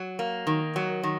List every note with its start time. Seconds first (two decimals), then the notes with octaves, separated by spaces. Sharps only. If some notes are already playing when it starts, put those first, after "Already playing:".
Already playing: F#3
0.19 A#3
0.47 D#3
0.76 F#3
1.03 D#3